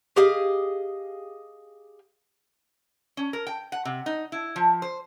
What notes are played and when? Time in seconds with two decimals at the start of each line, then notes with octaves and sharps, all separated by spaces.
0.16 G4 G#4 D#5 F5
3.17 C#4
3.33 A#4
3.47 G5
3.72 F#5
3.85 C3
4.06 D#4
4.32 E4
4.56 F3
4.82 C5